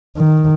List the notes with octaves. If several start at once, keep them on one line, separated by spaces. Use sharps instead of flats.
D#3